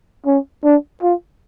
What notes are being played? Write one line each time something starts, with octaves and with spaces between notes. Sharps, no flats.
C#4
D4
F4